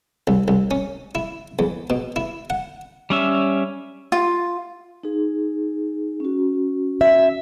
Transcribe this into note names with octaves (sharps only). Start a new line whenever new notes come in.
C2
C2
C#4
E4
E2
B2
E4
F#5
G3 C#4 E5
F4
D#4 G#4
C#4 F#4
E5